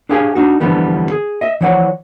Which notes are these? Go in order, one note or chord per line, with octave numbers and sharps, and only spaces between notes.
D4 G4 G#4 F5 G#5
D4 D#4 F#4
D3 E3 F3 G3 A3 B3
G#4
D#5 E5
E3 F3 C#5 D5 F#5